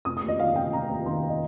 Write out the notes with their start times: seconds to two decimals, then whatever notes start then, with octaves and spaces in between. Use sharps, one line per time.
0.05 F1 D#6
0.17 D#6
0.22 D#2
0.28 D#5
0.39 D#3 F5
0.56 F1 G5
0.73 F1 A#5
0.90 D#2
1.06 D#3 C6
1.29 D#5